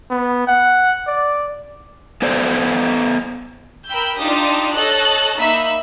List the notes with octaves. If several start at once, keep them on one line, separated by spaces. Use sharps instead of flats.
B3
F#5
D5
B3 A4 C5 D5
A#4 G5 B5 E6 G6
D4 D#4 F4 G4 D#6
A4 C#5 D#5 F#6
A#3 D#4 E5 B5 E6 B6